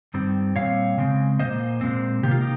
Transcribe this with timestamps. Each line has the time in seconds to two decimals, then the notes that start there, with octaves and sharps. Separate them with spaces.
0.14 G2 D#3 G3 C4
0.56 A#2 G3 C4 C#5 F5
0.98 C#3 G#3 C4
1.39 A#2 G3 A#3 C5 D#5
1.81 A#2 G#3 C4
2.23 C3 D#3 A#3 G4
2.31 F4
2.41 D#4 G4